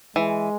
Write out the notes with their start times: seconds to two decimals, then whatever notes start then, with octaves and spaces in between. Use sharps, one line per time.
0.16 E3 G#3